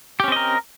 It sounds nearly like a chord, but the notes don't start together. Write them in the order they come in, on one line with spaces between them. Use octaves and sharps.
G4 C#4 C4 D#5 A#4